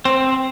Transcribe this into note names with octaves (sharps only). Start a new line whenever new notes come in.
C4